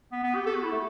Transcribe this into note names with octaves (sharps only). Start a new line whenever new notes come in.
B3
B3
G4
A4
F#4
E4
A3